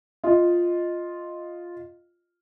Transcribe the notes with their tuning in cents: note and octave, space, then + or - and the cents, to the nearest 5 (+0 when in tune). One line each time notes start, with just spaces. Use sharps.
F4 +0 D#5 +0